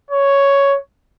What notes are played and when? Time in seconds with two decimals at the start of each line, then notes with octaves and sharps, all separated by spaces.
0.11 C#5